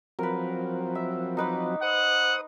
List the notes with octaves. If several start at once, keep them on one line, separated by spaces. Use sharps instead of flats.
F3 F#3 C4 A#4 B4
E5
D#4 B4 D6
C5 F#5 D#6